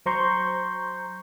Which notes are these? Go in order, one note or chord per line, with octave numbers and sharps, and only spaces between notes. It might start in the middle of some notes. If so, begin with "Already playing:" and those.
F#3 C5 A#5 C6 C#6 G6